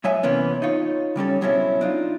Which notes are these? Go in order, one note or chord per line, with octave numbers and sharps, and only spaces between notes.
A2 F#3 C#5 D#5 E5 G#5
C3 E3 A#3 B3 C#4
D#4 F4 C#5
C#3 G3 C#4 A4
B2 F#3 C4 C#4 E4 A4
D4 D#4 F4